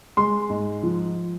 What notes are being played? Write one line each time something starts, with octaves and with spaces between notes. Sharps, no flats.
G#3 C6
G#2
F3